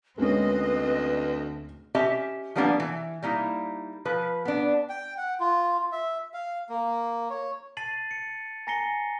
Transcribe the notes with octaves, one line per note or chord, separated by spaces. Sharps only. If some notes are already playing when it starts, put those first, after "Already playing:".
D2 G#3 A#3 C4 C#4 B4 D#5
C#4 G4 D#5 E5 A5
F3 G3 A#3 B3 D4
E3
G3 A#3 D#4 E4
F3 B4
B3 D4
G5
F#5
F4
E5
F5
A#3
C#5
A5 A6 C7 D#7 F#7
C#7
G#5 A#5 A#6 C7 C#7 G7